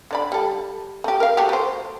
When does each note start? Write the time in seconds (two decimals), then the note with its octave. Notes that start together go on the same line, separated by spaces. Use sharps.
0.11 D3 D5 B5
0.32 G3 A4
1.04 A3 G4
1.20 A#4 F5
1.37 A3 F#4 G4
1.49 A3 C5